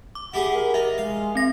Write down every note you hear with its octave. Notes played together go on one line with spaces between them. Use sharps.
D6
E4 G4 G#4 F#5
A#4
D#4 E5
G#3 F5
C4 A#6